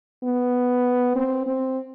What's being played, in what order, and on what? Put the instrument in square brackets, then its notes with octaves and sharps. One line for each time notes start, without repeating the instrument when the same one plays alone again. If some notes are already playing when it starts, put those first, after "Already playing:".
[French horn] B3
C4
C4